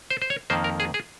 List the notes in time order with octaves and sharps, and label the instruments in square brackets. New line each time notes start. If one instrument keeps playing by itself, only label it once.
[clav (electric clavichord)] C5
C5
C#5
F2 D#3 A#3 C5
A#4
G#4
G#4